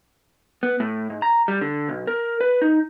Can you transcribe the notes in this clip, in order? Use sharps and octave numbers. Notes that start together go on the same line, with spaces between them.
B3
A2
G#2
A#5
G3
D3
B1
A#4
B4
D#4